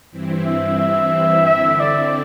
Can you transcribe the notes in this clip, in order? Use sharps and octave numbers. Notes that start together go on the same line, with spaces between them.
G2 E3 C4 E4
E5
E5
D3 C4 E4 E5
D5